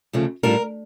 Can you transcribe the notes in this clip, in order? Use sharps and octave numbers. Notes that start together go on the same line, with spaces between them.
D2 C#3 F3 A3
A2 G3 D4 F4 A#4